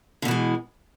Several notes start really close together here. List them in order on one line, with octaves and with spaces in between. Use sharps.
D3 B2 E3 G#3